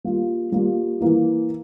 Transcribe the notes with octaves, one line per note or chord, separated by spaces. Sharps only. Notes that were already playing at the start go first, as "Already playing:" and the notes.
G3 A#3 F4
G3 A#3 F4
E3 A#3 E4